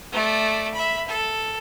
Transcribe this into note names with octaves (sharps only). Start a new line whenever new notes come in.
A3 D5
E5 B5
A4